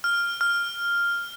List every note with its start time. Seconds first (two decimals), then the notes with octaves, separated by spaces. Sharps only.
0.04 F6
0.41 F6